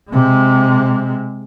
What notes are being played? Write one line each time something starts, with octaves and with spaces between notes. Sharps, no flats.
C3 G#3